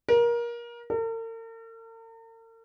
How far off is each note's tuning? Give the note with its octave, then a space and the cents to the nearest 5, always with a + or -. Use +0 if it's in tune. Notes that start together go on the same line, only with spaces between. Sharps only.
A#4 +25
A#4 -45